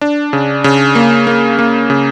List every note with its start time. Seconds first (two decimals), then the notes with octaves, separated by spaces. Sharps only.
0.01 D4
0.33 C#3
0.64 C#3
0.95 A#3
1.27 A#3
1.59 A#3
1.90 C#3